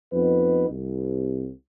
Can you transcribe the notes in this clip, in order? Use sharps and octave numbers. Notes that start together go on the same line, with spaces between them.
F2 B3 D#4 B4
C2